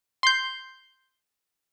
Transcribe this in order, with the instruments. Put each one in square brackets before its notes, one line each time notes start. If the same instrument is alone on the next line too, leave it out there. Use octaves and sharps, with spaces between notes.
[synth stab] C6 G6